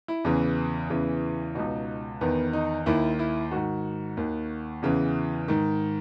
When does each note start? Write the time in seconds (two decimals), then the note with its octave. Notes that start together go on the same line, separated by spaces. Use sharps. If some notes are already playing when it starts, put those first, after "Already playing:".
0.08 E4
0.24 E2 C#3 E3
0.90 E2 C#3 E3
1.55 C#2 B2 D#4
2.21 E2 D#3 B3
2.53 D#4
2.86 D#2 D#3 E4
3.19 E4
3.51 G#2 D#3 F#4
4.17 D#2 D#3
4.82 E2 C#3 E3
5.48 G#2 D#3